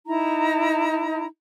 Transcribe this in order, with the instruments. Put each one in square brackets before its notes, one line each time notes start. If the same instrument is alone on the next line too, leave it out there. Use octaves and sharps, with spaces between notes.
[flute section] D#4 E4 A#5